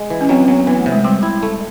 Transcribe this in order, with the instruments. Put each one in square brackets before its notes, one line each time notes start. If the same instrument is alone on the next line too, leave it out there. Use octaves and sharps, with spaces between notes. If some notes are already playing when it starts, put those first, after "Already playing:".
Already playing: [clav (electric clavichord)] G#3
E3
[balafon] C#4
[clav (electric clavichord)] F#3 [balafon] C4
[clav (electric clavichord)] F#3 [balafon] B3
[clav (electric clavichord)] E3 [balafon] B3
[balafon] A3
[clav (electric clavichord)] C3
[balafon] G#3
[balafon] G3 [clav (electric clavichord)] C4
[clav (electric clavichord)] E4
A3